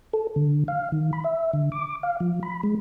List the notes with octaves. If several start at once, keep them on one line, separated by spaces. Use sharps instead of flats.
A4
D3
F5
D#3
B5
E5
D3
D6
F5
F3
B5
G#3